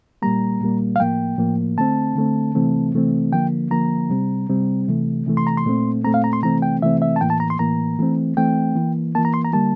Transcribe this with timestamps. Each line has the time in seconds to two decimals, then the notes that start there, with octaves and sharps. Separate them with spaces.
0.22 A#2 G3 A#3 A#5
0.61 A#2 G3 A#3
0.96 F5
0.99 A2 F3 A#3 G5
1.38 A2 F3 A#3
1.78 D3 A3 C4 A5
2.15 D3 A3 C4
2.55 C3 E3 A3 C4
2.94 C3 E3 A3 C4
3.33 D3 F3 A#3 G5
3.71 D3 F3 A#3 A#5
4.10 C3 G3 C4
4.49 C3 G3 C4
4.88 C3 E3 A3
5.26 C3 E3 A3
5.37 C6
5.47 A#5
5.57 C6
5.66 A#2 A3 C4
6.04 A#2 A3 C4 A#5
6.14 F5
6.24 A#5
6.33 C6
6.42 C3 E3 A3 C4 A#5
6.62 G5
6.82 C3 E3 A3 C4 E5
7.02 E5
7.16 A5
7.21 A2 E3 A#3 G5
7.30 A5
7.40 A#5
7.50 C6
7.59 A2 E3 A#3 A#5
7.99 E3 A3 C4
8.37 E3 A3 C4 G5
8.75 E3 A#3
9.15 E3 A#3 A5
9.25 A#5
9.34 C6
9.45 A#5
9.53 D3 G3 A#3 A5